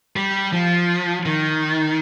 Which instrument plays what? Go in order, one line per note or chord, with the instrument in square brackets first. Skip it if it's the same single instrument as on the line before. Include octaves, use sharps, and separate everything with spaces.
[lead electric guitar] G3
F3
D#3